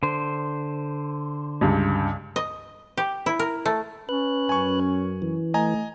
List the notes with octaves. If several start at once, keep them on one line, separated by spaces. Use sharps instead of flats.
D3 C5
C#2 G2
D#5
G4
E4
A#4
A3
C#4 B4 F#6
F#2 G#5 C#6
E3
A3 D#5 G#5 A#5